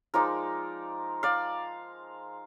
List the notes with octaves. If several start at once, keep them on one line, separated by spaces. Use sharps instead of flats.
F3 G#3 D#4 A#4 D5
D5 F5